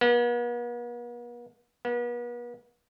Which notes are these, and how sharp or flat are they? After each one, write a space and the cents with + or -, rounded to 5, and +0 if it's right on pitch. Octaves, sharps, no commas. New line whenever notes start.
B3 -45
B3 -40